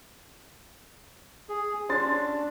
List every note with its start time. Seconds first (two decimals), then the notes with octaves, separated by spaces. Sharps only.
1.49 G#4
1.89 C#4 D4 C6 A6